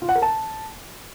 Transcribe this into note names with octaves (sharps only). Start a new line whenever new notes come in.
F4
F#5
A#4
A5